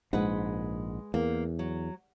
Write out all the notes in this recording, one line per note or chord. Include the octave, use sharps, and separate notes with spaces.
A#1 G#2 G#3 B4 F#5
E2 A#3
F#3